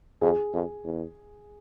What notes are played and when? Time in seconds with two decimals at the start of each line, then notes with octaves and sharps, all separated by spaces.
0.21 F2 G#4
0.53 F2
0.84 E2